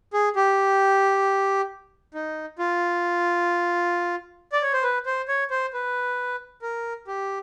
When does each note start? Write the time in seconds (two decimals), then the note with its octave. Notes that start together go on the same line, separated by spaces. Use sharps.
0.13 G#4
0.36 G4
2.14 D#4
2.59 F4
4.52 D5
4.62 C#5
4.73 C5
4.83 B4
5.06 C5
5.28 C#5
5.50 C5
5.73 B4
6.62 A#4
7.07 G4